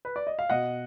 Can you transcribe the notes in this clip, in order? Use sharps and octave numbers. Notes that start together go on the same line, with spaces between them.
B4
D5
D#5
F5
B2 D#5 F#5